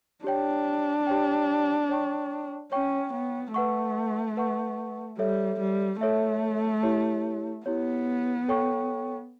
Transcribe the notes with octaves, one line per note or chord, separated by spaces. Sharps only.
D4 G4 C#5 G5
G4 C#5 G5
C#5 G5 C#6
C#4 C#5 G5 C#6
B3
A3 B4 F#5 C#6
B4 F#5 C#6
G3 A4 C#5 E5
G3
A3 A4 C#5 E5
E4 G4 C#5
B3 E4 G4 C#5
A4 C#5 G5 C#6